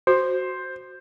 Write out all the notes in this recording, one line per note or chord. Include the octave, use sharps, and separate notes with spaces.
F#4 C5